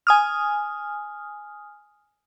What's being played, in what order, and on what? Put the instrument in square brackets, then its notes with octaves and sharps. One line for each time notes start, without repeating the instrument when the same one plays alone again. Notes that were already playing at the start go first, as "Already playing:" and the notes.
[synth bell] G#5 D#6 F6